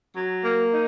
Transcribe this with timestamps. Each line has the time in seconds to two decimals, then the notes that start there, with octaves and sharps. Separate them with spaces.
0.16 F#3
0.44 A#3
0.71 D#4